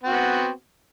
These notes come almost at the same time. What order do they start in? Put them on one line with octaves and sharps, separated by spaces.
C4 F#4 B3